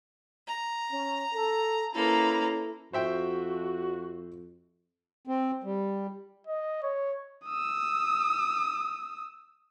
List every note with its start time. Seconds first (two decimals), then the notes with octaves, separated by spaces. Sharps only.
0.47 A#5
0.91 C#4
1.34 A4
1.95 A#3 C#4 E4 A4 B4 A#5
2.93 F2 F#4 C5 E5 G5
5.27 C4
5.64 G3
6.47 D#5
6.83 C#5
7.46 D#6 E6